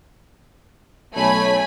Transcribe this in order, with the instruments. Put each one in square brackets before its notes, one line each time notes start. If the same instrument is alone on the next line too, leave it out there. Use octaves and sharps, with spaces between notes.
[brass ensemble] B1 C#5 [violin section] A3 G#5 B5